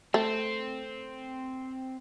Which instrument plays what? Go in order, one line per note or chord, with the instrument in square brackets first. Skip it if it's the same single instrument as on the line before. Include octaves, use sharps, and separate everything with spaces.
[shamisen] A3 [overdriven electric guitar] C4